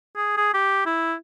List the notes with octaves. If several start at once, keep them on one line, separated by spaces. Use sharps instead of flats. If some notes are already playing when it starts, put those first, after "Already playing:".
G#4
G#4
G4
E4